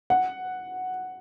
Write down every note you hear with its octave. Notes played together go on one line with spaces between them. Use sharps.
F#5